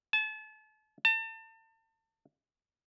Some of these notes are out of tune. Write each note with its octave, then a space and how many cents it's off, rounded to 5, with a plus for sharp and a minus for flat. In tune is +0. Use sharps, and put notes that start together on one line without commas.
A5 -35
A5 +35